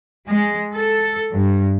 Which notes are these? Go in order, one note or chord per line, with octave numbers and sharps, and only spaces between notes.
G#3
A4
G2